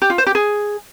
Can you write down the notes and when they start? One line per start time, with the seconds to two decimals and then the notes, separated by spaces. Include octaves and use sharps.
0.02 G4
0.10 F4
0.18 C5
0.27 G4
0.35 G#4